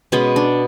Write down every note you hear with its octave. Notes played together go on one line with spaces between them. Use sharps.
B2 G#3 B3 C#4
D4